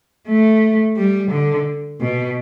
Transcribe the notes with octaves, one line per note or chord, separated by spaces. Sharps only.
A3
G3
D3
B2